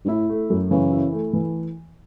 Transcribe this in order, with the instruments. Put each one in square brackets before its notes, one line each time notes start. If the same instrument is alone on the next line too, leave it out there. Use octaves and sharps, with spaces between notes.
[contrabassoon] G2
[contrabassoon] A2 [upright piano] E4
[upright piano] A3
F#2
[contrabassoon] C#3 [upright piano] E3
[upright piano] E4
A3
E3